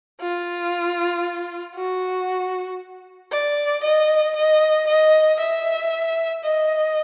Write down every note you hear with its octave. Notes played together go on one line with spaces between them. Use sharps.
F4
F#4
D5
D#5
D#5
D#5
E5
D#5